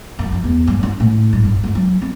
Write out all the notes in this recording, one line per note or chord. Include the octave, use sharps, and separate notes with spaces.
F#2
F3
E2
G2
C#4
A2
G2
G2
C#2
F#3
C4